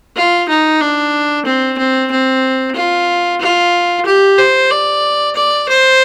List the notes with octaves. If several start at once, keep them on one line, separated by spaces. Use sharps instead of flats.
F4
D#4
D4
C4
C4
C4
F4
F4
G4
C5
D5
D5
C5